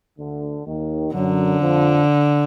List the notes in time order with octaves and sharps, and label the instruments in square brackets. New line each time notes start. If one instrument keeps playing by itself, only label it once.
[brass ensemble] D2 D3
D#2 D#3
[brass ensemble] F#2 F#3 [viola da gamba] D3
[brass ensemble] F2 F3